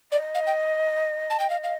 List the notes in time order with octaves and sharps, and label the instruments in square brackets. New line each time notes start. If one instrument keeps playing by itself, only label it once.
[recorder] D5 [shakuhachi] D#5
[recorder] F5
G5
A5
G5
F5
F5